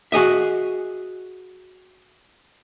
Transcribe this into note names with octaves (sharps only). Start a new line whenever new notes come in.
F#4 G#4 D#5 E5